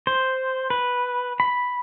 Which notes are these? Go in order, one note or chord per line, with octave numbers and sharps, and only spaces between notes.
C5
B4
B5